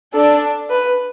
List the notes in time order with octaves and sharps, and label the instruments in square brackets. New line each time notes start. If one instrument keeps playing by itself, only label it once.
[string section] D4 [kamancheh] A4
[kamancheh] B4